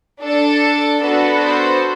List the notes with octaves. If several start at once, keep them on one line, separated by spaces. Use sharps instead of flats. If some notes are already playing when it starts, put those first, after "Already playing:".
D4 A4
B3 D4 F#4 A4 B4
C5